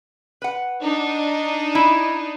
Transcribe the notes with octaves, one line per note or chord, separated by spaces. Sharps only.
B4 F#5
D4 D#4
E4